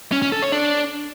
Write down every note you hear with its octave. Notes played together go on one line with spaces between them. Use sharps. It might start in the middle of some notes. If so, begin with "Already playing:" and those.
C#4
C#4
A4
C#5
D4